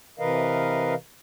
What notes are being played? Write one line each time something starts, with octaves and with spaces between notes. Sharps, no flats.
C3 E3 A#4 B4 D#5 F5